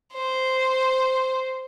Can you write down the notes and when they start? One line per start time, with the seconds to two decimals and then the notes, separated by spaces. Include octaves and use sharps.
0.14 C5